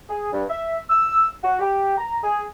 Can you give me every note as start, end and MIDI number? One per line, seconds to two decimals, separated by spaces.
0.09 0.28 68
0.32 0.43 43
0.49 0.78 76
0.89 1.28 88
1.43 1.56 66
1.60 1.97 67
1.98 2.17 82
2.24 2.43 68